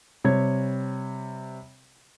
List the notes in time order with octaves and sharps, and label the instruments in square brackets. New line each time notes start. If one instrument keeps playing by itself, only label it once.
[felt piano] C3 G3 C#5 G#6